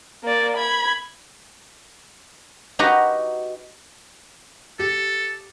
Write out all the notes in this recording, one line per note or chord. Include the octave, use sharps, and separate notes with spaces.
A#3 D5
B5 G#6
D#4 F#4 G4 B4 F#5 A#5
G4 A4